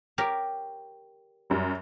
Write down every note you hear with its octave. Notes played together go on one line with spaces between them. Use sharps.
G4 A#4 C#5
F#2 G3